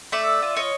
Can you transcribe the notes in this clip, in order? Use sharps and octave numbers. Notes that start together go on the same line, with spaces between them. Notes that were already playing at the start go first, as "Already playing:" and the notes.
A3 D5 E5
F4
C#5 D#5